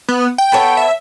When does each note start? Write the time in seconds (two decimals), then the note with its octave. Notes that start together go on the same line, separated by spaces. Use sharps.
0.09 B3
0.38 G5
0.52 B3 A4 C#5
0.77 E5